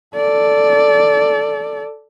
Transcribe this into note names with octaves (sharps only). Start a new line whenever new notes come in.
A4 D5